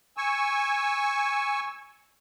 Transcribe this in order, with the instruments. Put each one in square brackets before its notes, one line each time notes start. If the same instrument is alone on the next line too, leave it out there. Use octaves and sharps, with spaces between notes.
[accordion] G#5 C#6 E6